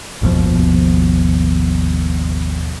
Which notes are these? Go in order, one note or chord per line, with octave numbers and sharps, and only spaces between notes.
G#1 D#2 B2 F3